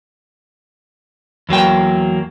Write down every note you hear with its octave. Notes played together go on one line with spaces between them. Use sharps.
E2 F#3 A#3 G5